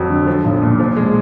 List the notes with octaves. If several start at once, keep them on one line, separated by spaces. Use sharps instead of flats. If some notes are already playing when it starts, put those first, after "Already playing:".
Already playing: F2 F#3
D3
F3
B1
A#2
F3
G#3